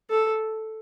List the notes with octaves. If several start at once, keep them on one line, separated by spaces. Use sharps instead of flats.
A4